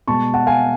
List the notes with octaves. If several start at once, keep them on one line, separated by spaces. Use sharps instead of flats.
B2 G#3 A5 C#6
F#5 A5
F5 G#5